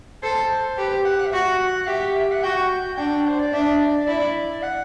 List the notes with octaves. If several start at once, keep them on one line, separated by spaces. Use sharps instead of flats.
A4 C5
G4 B4
C5
F#5
F#5
E5
F#4 F#5
G4 E5
E5
F#5
F#4 G5
D4 G5
C5
D5
D4 E5
D5
E4 D5
F#5